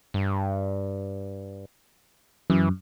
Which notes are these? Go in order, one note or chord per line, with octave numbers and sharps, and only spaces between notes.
G2
F#2 E3